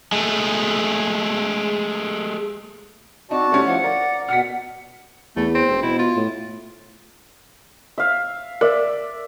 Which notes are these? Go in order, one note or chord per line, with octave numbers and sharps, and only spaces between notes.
G#3 A3
C4 D#4 F#4 D5 A5
A3 C#4 E4 G4
F3 F#5
A#4 D5
B2 F#5 F6 B6
E2 A3
C4
E1
B2 E4
F4
A2
E5 F5
A#4 D5 E5